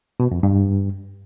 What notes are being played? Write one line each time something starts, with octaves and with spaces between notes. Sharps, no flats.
B2
F2
G2